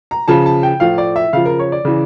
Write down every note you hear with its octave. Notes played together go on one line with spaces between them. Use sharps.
A#5
C#3 F3 A5
A5
G5
A2 F3 F5
D5
E5
C#3 F3 F5
A#4
C#5
D5
C#3 E3